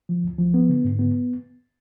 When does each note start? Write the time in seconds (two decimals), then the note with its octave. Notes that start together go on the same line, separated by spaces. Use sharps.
0.09 F3
0.24 D2
0.39 F3
0.54 B3
0.69 D3
0.84 G#2
0.99 B3